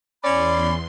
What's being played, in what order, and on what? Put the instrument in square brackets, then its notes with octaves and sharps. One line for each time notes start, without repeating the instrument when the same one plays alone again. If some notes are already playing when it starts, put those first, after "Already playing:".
[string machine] E2 C6 [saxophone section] C#4 D5 [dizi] B5